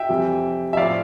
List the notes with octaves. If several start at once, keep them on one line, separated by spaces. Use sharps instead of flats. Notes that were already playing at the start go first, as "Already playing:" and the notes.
Already playing: E5 G5
F2 C3 E3 G3
E5
A2 F3 D5 F5